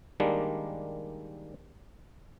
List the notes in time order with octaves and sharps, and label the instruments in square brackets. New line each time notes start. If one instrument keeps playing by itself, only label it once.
[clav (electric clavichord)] D#3 G3 G#3 A#3 D4